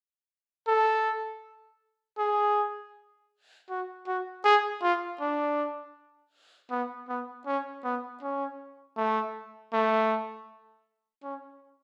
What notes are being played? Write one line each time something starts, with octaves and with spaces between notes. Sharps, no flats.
A4
G#4
F#4
F#4
G#4
F4
D4
B3
B3
C#4
B3
C#4
A3
A3
C#4